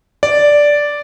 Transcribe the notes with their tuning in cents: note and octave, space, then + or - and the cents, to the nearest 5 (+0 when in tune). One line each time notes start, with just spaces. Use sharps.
D5 -5